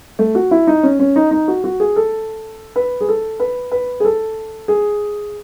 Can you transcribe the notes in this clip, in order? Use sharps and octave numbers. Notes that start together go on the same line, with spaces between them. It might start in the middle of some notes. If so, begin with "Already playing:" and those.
A3
F#4
E4
D#4
C#4
C#4
D#4
D#4
F#4
F#4
G#4
A4
B4
G#4
A4
B4
B4
G#4
A4
G#4